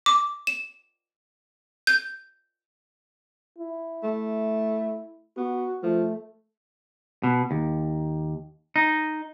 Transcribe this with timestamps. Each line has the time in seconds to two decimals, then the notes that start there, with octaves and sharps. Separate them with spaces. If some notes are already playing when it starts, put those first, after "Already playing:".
0.06 D6
0.47 E7
1.87 G6
3.58 E4
4.03 A3
5.37 B3 F#4
5.83 F3 A3
7.23 B2
7.51 D#2
8.76 D#4